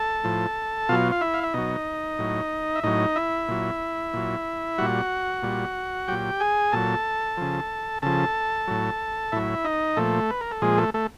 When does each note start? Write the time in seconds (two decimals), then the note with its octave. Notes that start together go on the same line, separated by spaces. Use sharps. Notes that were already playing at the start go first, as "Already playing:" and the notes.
Already playing: A4 A5
0.24 A2 F3
0.89 B2 F#3 F4 F5
1.12 F5
1.21 E4 E5
1.34 F5
1.43 E5
1.54 B2 F#3 D#4 D#5
2.18 A2 F#3
2.76 E5
2.83 A2 F#3 D#4 D#5
3.16 E4 E5
3.48 A#2 F#3
4.13 A#2 F#3
4.78 A#2 G3 F#4 F#5
5.43 A#2 G3
6.08 A#2 F#3 G4 G5
6.40 G#4 G#5
6.72 A#2 F#3 A4 A5
7.37 C#3 F3
8.02 C#3 F3 A4 A5
8.68 A2 F#3
9.32 A2 F#3 E4 E5
9.65 D#4 D#5
9.97 A#2 F3 A3 A4
10.30 B4
10.41 A#4
10.51 A4
10.62 A#2 F3 G#3 G#4
10.78 A3 A4
10.94 A3 A4